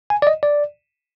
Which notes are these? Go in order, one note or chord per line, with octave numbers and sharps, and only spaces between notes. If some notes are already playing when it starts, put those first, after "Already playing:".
G#5
D5
D#5
D5